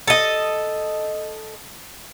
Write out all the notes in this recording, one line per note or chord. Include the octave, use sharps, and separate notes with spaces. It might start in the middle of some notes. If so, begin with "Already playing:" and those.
A4 D#5